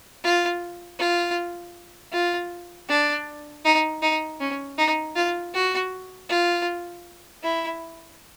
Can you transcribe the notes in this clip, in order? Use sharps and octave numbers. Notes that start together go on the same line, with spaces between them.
F4
F4
F4
D4
D#4
D#4
C#4
D#4
F4
F#4
F4
E4